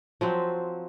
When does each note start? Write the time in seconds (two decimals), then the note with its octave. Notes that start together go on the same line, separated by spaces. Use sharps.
0.21 F3 F#3 C4